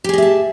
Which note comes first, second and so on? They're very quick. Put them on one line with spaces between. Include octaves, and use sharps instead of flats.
G4 G#4 D#5 E5 A5